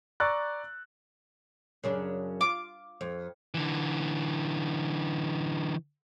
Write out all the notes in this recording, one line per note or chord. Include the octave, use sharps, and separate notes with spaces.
D5 A#5 C#6 E6 F#6 A6
F#2 C#3 D4
F4 D6
F2
D3 E3